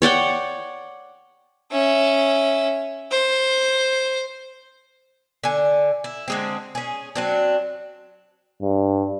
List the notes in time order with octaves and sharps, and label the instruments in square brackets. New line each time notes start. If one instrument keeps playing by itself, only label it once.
[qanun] C#5 D5 F#5 G5
[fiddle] C#4 E5
C5
[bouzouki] D3 G#5
E4
D3 G#3 C4
C#4 G#4
F#3 C4 D4
[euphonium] G2